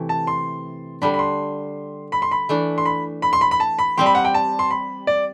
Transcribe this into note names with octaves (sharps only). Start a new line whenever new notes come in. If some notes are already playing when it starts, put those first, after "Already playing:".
Already playing: C3 E3 A3
A5
C6
D3 G3 D4 B5
B5
C6
B5
C6
B5
E3 A3 D4
C6
B5
B5
C6
B5
B5
A5
B5
G3 C4 G4 C6
B5
F#5
G5
A5
C6
B5
D5